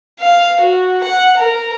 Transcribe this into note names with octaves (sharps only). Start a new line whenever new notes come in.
F5
F#4
F#5
A#4